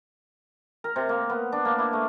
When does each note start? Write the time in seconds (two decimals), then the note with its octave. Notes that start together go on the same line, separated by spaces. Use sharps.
0.84 A#4
0.96 C3
1.09 A#3
1.30 B3
1.52 D4
1.65 A#3
1.79 E4
1.93 A3